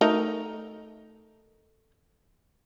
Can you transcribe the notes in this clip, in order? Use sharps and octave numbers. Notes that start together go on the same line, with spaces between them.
A3 D#4 A#4